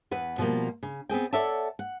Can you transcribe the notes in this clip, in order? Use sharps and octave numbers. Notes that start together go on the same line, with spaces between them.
E2 B4 F#5
B2 F3 G3 A#3
C#3
B3 C4 G#4 G5
A4 C#5 D5 E5 F#5 A5
F#5